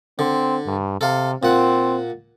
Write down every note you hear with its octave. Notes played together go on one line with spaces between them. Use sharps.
D3 C4
G2
C3 A4 F5
A#2 C4 F#5